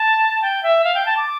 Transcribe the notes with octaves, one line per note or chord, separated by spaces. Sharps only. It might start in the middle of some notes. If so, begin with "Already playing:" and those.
Already playing: A5
G5
E5
F5
G5
A5
D6